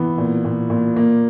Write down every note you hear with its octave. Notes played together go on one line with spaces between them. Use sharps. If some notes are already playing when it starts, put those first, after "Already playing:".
Already playing: E3 B3
A#2
A#2
A#2
A#3